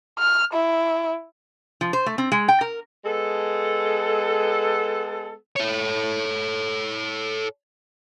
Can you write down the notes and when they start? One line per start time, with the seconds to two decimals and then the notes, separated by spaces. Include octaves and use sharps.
0.19 F6
0.53 E4
1.81 F3
1.93 C5
2.06 A3
2.18 C4
2.32 G#3
2.48 G5
2.61 A#4
3.05 G#3 B3 A4
5.56 A4 C#5